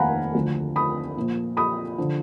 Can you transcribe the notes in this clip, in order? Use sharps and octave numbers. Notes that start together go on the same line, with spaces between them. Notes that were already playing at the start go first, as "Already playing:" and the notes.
Already playing: F1 D#2 D#3 F5 F#5 G#5 A#5 B5
D2 D3 F3
B5 D#6
A#1 A#2 F3
B5 D#6
D3 F3